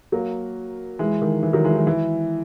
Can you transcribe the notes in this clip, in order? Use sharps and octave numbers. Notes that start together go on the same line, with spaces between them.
F#3 A#3
E3 G#3
D#3
E3
D#3 F#3
E3 G#3
E3
E3